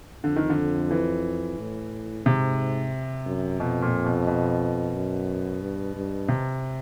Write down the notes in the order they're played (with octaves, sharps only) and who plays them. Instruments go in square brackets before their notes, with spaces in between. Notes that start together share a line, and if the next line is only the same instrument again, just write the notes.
[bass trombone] F2 [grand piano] D3
[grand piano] D#3
D3
E3
[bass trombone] A2
[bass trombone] G#2 [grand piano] C3
[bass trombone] F#2
[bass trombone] F2 [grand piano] B2
[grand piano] A#2
B2
B2
[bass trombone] F#2
G2
G2
[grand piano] C3